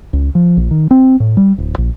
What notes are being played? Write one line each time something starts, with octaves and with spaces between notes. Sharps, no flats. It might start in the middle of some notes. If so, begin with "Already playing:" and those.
C#2
F3
A#1
D#3
C4
A2
G3
D1
A#1